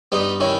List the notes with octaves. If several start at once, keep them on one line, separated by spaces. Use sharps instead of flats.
G2 B3 D#4
D#3 C#4 E4